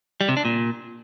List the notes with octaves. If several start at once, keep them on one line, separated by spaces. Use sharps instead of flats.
G3
C3
D4
A#2